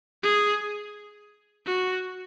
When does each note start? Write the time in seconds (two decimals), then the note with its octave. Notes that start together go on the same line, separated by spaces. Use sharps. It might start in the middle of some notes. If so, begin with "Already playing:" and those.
0.23 G#4
1.66 F#4